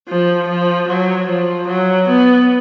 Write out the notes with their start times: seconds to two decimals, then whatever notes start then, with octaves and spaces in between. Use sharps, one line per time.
0.08 F3
0.48 F3
0.88 F#3
1.27 F3
1.68 F#3
2.07 B3